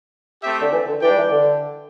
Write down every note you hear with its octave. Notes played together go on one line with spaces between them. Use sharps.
A3 C4 G4 E5
D3
E3
D3
E3 D4 G4 D5 G5
G3
E3
D3